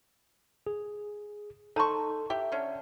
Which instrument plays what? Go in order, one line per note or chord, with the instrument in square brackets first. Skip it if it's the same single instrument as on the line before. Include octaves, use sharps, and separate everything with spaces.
[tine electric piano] G#4
[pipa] D#4 C#6 [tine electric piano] A4 [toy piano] A5 A#5 C6
[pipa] G4 [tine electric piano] E5
[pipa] D3 C#4